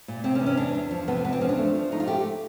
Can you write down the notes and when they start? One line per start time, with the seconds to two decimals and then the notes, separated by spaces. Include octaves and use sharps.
0.08 A#2
0.24 C3 C4
0.35 C#4
0.41 E2
0.46 C#4
0.57 E2 D4
0.75 E2
0.91 F3
1.08 C3 B3
1.24 E2 B3
1.33 C4
1.41 F3 C#4
1.49 D4
1.57 A3
1.75 F3
1.92 A3 D#4
2.00 F4
2.07 A3 G4